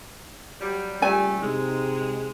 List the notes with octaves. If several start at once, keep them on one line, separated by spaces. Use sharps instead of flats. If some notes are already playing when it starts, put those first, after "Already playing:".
F#3 G3
A#2 C#3 G3 A3 D5 G#5
C3 G#3 D#4